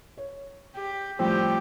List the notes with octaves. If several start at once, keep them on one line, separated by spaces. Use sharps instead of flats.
C#5
G4
A2 F3 G3 C4 G4